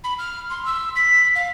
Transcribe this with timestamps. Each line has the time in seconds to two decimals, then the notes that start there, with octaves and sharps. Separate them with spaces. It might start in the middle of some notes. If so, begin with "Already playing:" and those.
0.04 B5
0.19 F6
0.50 C6
0.66 E6
0.96 B6
1.35 F5